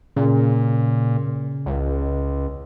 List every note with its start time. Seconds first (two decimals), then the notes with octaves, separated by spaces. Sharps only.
0.16 A#2 C#3
1.66 C#2